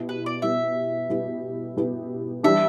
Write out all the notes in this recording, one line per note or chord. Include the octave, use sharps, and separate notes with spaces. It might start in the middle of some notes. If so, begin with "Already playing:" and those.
Already playing: B2 B3 E4 G4
B4
D5
B2 B3 E4 G4 E5
B2 B3 E4 G4
B2 B3 E4 G4
E3 G3 D4 G4 E5